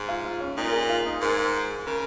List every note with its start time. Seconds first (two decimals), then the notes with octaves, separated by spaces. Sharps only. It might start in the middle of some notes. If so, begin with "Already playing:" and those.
Already playing: G#2
0.09 F4
0.25 F4
0.40 C#4
0.57 A#2 D#4
0.68 A#4
0.73 G#4
0.89 F4
1.06 D#4
1.21 G#2 A#4
1.86 C#3 A#4